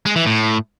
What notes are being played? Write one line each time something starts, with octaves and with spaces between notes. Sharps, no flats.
G#3
E3
A2